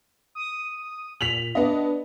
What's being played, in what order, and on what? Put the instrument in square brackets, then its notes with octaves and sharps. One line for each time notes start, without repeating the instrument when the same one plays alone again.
[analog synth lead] D#6
[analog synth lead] A#2 [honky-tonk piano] B6 F7 F#7
[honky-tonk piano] B3 D#5 [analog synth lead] D4